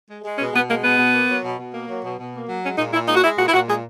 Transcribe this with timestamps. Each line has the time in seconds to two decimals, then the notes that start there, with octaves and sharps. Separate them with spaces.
0.09 G#3
0.24 G#3
0.38 B2 C#4
0.53 B2 B3
0.68 G#3 A#3
0.84 B2 B3
0.98 B2
1.14 A#3
1.29 F#3
1.44 B2
1.59 B2
1.74 A#3
1.88 F#3
2.04 B2
2.19 B2
2.34 A#3
2.48 F#3
2.63 G#3 C#4
2.78 A#2 D#4
2.93 A#2 E4
3.08 G#3 D#4
3.16 F#4
3.23 G#3 E4
3.38 A#2 F#4
3.49 E4
3.54 A#2 F#4
3.68 G#3 G#4